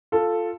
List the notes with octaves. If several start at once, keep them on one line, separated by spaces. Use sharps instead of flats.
F4 A4